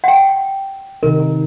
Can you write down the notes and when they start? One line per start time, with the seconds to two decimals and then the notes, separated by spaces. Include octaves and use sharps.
0.04 F#5 G5
1.03 C3 D#3 D#4 A#4